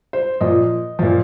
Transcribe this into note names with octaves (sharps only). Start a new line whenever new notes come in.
C5
A#2 F3 D#5
A#2 F3